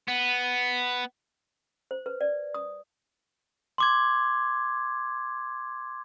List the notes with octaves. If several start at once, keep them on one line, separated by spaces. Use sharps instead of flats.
B3
C5
B4
D5
D#6
C6 D6 G#6